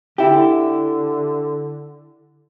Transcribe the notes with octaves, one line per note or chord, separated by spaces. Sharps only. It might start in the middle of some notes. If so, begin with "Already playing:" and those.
D3 E4 G4